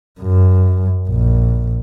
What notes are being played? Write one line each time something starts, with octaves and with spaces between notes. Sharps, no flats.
F#2
A#1